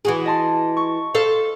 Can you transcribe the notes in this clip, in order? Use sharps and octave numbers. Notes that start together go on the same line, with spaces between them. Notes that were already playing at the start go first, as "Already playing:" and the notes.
E3 F#4 G#4
D#5 A5 C6
C#6
A4 C5 F5